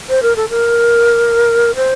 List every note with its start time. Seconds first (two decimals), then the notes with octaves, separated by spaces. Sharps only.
0.09 C5
0.22 A#4
0.36 A4
0.50 A#4
1.76 C5